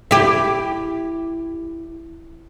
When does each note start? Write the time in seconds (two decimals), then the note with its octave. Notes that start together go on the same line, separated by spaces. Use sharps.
0.11 E4 G4